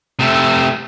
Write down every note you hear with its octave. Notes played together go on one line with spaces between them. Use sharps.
C3 A3